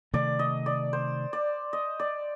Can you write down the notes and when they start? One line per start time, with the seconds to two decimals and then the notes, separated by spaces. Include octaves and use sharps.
0.13 C3 D#3 A3 D5
0.39 D#5
0.66 D5
0.93 C5
1.33 D5
1.73 D#5
2.00 D5